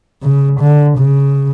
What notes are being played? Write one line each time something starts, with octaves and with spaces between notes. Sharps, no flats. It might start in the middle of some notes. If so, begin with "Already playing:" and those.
C#3
D3
C#3